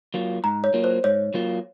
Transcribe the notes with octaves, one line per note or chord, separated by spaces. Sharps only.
F#3 A#3 F4
G#2 A#5
C#5
F#3 A#3 F4
C5
G#2 C#5
F#3 A#3 F4